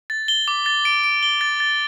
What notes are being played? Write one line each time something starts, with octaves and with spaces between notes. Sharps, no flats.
A6
G7
D6
A6
D7
D7
G7
A6
A6